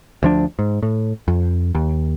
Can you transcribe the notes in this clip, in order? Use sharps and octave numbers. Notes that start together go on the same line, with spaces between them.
D2 F3 D4
G#2
A2
F2
D#2